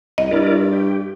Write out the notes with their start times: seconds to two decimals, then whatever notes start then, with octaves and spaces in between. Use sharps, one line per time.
0.18 C2 D#5
0.31 G2 E4 A#4 D5
0.72 G4